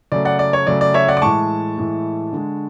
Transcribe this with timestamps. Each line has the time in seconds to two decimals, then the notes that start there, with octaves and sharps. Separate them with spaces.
0.12 C#3 F#3 A3 D5
0.25 D5 F#5
0.39 D5
0.53 C#5
0.67 C#3 F#3 A3 D5
0.81 D5
0.94 C#5 E5
1.08 D5 F#5
1.17 D6
1.22 A2 E3 G#3 A5 C#6
1.77 A2 E3 G#3
2.33 D3 G#3